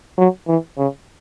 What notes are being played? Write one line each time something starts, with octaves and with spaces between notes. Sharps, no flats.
F#3
E3
C#3